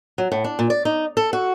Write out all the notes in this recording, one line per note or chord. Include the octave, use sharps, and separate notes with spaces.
F#3
A2
D4
A#2
D5
D#4
A4
F#4